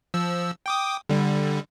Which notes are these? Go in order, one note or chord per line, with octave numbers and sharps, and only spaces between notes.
F3 E6
G5 D6 D#6
D3 G3